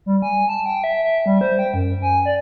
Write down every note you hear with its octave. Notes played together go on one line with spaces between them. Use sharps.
G3
G#5
A5
G5
E5
E5
G3
C5
G5
F#2
G#5
D5